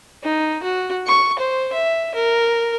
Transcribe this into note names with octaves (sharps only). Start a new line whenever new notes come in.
D#4
F#4
C#6
C5
E5
A#4